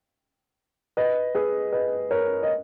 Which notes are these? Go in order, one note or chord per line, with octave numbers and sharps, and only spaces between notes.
B4 D#5
G#4 B4
B4 D#5
A#4 C#5
D#5